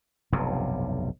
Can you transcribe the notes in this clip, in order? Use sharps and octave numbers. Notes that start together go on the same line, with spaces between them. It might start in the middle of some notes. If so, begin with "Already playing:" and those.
F1 B1 G2 C3